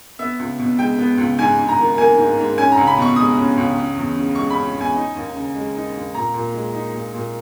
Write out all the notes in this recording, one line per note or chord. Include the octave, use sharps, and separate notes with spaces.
B3 E5
C#2
B2
G#3 G5
B3
C#2
G#2 G#5
G#2
A#5
D#3
A#3 G#5
G#2
G#2
C#4 G#5
A#5
C#2
B5
B2
C#6
G#3 D#6
C#4
C#2
C#4
E2
C#3
G#3 C#6
C#4 B5
E2 G#5
D#4
D#2
C#3
G#3
D#4
D#2
A#2 A#5
A#2
G#3
D#4
A#2
A#2